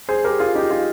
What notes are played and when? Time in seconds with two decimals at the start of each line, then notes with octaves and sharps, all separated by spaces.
0.09 G#4 C5
0.24 G4 A#4
0.39 F4 G#4
0.55 D#4 G4
0.70 F4 G#4